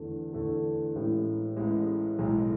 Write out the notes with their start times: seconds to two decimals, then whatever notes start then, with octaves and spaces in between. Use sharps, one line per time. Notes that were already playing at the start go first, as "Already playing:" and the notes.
Already playing: E2 D3 A3
0.33 E2 D3 A3
0.95 A1 A2 G#3
1.57 A1 A2 G#3
2.18 B1 A2 G#3